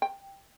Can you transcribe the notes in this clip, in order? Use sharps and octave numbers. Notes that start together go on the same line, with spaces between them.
G5